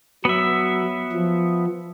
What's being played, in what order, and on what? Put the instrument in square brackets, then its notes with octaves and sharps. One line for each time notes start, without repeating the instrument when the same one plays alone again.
[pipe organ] F#3 [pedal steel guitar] B3 E5
[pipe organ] F3